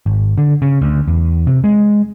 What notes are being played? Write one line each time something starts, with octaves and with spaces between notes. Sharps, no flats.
G#1
D3
C#3
D2
E2
C3
G#3